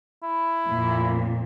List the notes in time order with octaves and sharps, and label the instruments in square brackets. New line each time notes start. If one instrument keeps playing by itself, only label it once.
[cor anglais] E4
[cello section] F2 A#2